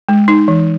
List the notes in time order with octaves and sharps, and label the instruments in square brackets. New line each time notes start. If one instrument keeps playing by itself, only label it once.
[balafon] G#3
D#4
E3